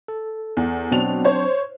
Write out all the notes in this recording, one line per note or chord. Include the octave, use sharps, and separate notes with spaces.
A4
E2
B2 F#3 C4 D4 F7
C5 C#5